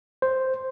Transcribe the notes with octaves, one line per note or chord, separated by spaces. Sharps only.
C5